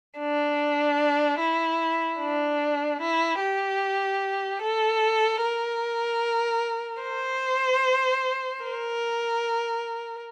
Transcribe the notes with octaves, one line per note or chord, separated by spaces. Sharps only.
D4
E4
D4
E4
G4
A4
A#4
C5
A#4